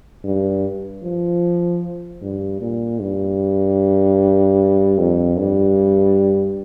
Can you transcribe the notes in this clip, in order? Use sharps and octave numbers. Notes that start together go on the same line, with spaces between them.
G2
F3
G2
A#2
G2
F2
G2